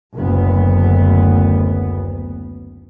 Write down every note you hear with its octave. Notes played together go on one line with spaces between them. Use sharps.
F#1 D2 B3